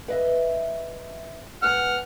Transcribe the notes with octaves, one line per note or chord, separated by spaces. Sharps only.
B4 D#5 E5
G#2 B3 F#5 G#5 F6